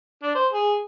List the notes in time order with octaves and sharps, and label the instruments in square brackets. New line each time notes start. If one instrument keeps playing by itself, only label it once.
[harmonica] D4
C5
G#4